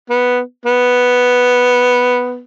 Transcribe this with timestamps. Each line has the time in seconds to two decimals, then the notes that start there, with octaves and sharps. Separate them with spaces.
0.10 B3
0.66 B3